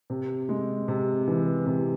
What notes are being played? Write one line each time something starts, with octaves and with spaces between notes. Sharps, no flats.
C3
G#3
C3
E3
C3